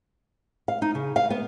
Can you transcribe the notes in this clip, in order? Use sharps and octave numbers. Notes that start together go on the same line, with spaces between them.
F5
D#4
C#3
F5
B3